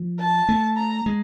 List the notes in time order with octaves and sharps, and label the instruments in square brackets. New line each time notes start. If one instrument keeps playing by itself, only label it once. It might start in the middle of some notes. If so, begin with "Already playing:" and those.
Already playing: [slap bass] F3
[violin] A5
[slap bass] A3
[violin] A#5
[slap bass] G#3